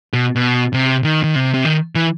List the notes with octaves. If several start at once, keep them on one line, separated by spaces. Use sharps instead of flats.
B2
B2
C3
D#3
D#3
C3
C3
D#3
E3